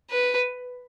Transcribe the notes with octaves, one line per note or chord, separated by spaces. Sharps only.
B4